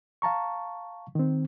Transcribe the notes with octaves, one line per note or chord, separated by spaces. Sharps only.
F5 A5 A#5 C#6
D#3 C4